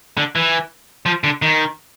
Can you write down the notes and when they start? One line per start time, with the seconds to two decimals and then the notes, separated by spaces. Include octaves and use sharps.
0.17 D3
0.36 E3
1.06 F3
1.24 D3
1.42 D#3